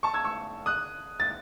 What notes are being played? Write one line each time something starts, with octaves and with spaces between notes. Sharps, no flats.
A5 C#6
E6 G#6
C#6 E6
D#6 F#6
A6